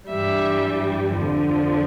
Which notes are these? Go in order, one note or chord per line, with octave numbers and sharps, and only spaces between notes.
G2 E3 G3 E5
F2 D3 F3